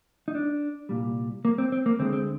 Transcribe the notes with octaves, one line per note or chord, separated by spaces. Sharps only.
D#4
D4
C2 A#2 G3
A#3
C4
C4
A#3
D2 D3 G#3 C4
C4